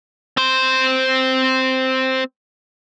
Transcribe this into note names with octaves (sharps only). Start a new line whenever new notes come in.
C4 C5